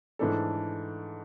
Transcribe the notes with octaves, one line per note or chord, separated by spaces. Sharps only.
G#2 E3 A3 D4 A4